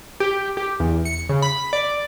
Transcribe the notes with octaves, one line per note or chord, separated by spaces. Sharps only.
G4
G4
E2
C#7
C#3
B5
D5